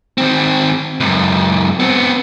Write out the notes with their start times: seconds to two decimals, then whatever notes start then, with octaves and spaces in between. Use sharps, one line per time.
0.18 D#3 C4
1.00 C#2 F#2
1.80 B3 C4